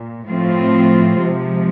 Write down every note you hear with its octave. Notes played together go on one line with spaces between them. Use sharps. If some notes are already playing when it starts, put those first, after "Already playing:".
Already playing: A#2
A2 F3 A3 C4 F4
C3 F3 G#3